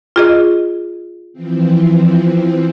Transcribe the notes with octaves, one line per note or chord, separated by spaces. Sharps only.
F4 G#4 D#5
E3 F3 C4